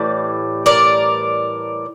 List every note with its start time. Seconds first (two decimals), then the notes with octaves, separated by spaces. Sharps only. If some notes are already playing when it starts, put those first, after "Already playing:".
Already playing: A2 E3 G3 D5
0.66 A#4 D5